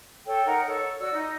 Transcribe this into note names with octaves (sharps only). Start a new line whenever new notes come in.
A4 C#5 G5
D#4 A#4 F#5 A#5
A4 C#5
F#4 D5 E6
D#4 D#5